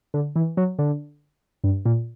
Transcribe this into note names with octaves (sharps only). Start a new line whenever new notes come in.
D3
E3
F#3
D3
G2
A#2